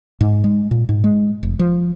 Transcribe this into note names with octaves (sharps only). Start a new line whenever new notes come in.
G#2
G#3
A#2
G#2
G#3
F1
F3